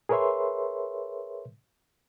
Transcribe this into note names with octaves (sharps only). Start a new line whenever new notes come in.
G#4 A#4 B4 C#5 E5 C6